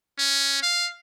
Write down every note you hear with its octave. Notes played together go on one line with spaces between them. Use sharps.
C#4
F5